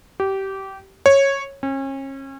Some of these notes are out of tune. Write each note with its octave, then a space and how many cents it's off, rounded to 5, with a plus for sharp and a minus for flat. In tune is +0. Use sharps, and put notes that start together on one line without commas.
G4 -20
C#5 -10
C#4 -35